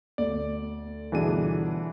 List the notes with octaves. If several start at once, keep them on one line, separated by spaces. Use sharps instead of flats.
D2 D5
G1 B2 E3 D4 G#4 D#7